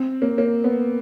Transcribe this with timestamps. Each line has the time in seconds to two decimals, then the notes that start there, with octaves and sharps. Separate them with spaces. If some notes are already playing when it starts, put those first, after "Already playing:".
Already playing: C4
0.22 A#3
0.38 A#3
0.64 B3